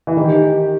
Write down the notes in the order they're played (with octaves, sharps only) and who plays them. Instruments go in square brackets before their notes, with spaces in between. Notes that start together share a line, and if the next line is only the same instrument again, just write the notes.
[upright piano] E3
[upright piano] D#3 [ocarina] G4